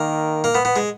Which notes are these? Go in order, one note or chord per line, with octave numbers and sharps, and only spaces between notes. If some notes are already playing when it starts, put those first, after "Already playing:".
Already playing: D#3 A#3
A#3
B3
B3
G#3